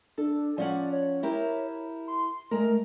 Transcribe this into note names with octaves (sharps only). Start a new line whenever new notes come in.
D4 A4
F3 C#4 D5 F#5
C#5
E4 G4 A#4
C6
G#3 A3 A#4